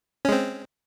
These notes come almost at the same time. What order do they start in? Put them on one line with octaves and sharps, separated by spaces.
C#4 G#3 C4